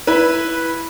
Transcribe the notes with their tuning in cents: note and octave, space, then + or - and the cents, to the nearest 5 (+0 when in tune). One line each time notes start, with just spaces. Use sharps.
E4 +0 B4 -10